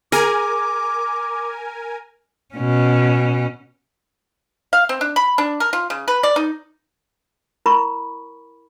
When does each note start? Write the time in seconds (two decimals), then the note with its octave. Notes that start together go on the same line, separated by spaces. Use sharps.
0.12 G#4 A#4 G#5 D6
2.55 B2 C#4
4.73 F5
4.89 C4
5.01 D4
5.16 B5
5.38 D4
5.60 A#4
5.73 F4
5.90 C#3
6.08 B4
6.23 D5
6.36 D#4
7.66 E4 A#4 B5 C#6